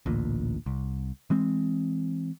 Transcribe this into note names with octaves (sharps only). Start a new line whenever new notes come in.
A1 D2 A#2
C2
E3 G#3 C4